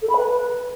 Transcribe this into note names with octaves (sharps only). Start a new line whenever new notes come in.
A4
B5
B4